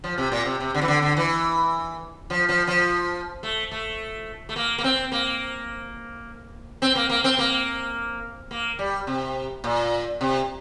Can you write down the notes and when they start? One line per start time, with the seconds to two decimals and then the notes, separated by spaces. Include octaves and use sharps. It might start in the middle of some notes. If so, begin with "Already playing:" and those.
0.04 F3
0.18 C3
0.32 A#2
0.46 C3
0.60 C3
0.75 D3
0.82 E3
0.88 D3
1.02 D3
1.17 E3
2.30 F3
2.49 F3
2.67 F3
3.43 A3
3.71 A3
4.49 A3
4.56 A#3
4.78 A#3
4.84 C4
5.12 A#3
6.82 C4
6.95 A#3
7.09 A#3
7.24 C4
7.39 A#3
8.51 A#3
8.79 G3
9.07 C3
9.64 A#2
10.21 C3